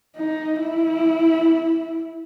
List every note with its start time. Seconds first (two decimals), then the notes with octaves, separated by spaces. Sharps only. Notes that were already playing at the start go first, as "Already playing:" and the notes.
0.16 D#4
0.60 E4